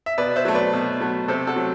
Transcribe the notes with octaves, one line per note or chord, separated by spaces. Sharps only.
E5
B2 B4 D5
C5 E5
F#3 A3
B4 D5
B2
F#3 A3
C3 A4 C5
F#4 A4
F#3 A3